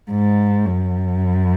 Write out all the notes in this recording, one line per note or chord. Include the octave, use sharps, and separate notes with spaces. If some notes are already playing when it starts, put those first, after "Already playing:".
G#2
F#2